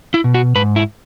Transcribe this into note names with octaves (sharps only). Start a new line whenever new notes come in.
E4
B2
F#4
G#2 B4
E4